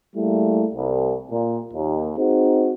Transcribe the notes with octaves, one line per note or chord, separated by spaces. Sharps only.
G3 A3 A#3 E4 G#4
C2
A#2
D#2
C4 D#4 F#4 G#4 C5